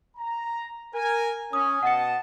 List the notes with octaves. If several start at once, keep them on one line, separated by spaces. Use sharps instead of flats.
A#5
A#4 G#5
C#4 D#6
B2 D#5 F#5 A5 C#7